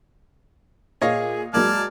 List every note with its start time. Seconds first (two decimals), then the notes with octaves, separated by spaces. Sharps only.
1.02 A#2 G#4 C#5 D#5 F5
1.54 F#3 G#3 A#3 D5 A5 F6 G#6